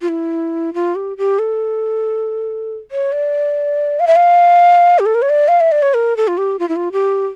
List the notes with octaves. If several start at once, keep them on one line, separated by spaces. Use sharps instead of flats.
F4
E4
F4
G4
G4
A4
C#5
D5
F5
E5
F5
G4
A4
A#4
C#5
D5
F5
E5
D5
C#5
A#4
A4
F4
G4
F4
E4
F4
G4